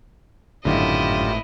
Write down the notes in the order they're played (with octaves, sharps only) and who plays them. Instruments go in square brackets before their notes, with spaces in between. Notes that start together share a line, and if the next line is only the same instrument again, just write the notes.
[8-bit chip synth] G#1 A2 [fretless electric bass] F#2 D3 [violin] E4 D#5 [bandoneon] F4 G4